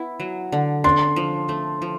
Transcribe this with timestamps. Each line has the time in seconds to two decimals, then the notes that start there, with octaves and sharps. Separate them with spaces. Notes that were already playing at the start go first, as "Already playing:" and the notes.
Already playing: B3 E4
0.20 F#3
0.52 D3
0.84 D4 C6
1.16 F3
1.49 A3
1.82 F3